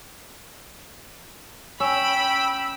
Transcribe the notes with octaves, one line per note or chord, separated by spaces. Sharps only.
C#4 G5 B5 E6